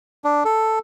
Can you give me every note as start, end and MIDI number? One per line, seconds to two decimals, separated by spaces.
0.24 0.44 62
0.45 0.79 69